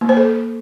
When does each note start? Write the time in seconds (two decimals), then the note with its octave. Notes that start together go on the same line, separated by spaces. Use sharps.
0.01 A#3
0.09 C5
0.17 A4